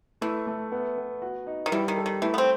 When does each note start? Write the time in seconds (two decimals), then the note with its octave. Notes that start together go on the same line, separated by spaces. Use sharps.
0.21 E3 A3
0.47 A3
0.72 B3
0.97 B3
1.22 F#4
1.47 D#4
1.66 D#3
1.72 E3 G3
1.88 D#3
1.97 A4
2.06 D#3
2.22 E3 A3
2.34 B3
2.38 C4